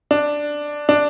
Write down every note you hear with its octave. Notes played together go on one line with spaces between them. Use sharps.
D4
D4